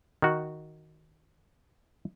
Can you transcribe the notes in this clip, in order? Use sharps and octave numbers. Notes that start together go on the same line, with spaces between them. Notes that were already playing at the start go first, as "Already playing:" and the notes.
D#3 F#4